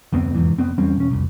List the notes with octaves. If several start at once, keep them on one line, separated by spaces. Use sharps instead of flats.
F1 D2 B3 C4
F1 E2 G#2 E3
F1 A2 B3 C4
E2 G3 C4 C#4
E1 C#4
F1 C2